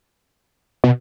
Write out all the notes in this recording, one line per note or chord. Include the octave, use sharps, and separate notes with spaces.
B2